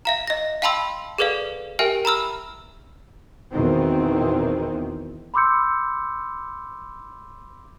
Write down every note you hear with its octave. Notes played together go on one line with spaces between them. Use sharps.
E5 F5 A#5
D#5 A#6
F5 G5 A5 B5 C6 E6
G#4 A4 B4 D5 F5
G4 A#4 E5 G5 G#5 F6
A#5 B5 E6 F6
E2 B2 D#3 C4
B5 C6 D6 E6 G6 C#7